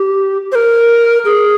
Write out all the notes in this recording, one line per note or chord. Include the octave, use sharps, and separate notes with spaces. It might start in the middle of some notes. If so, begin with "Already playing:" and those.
Already playing: G4
C5
A#4
G#4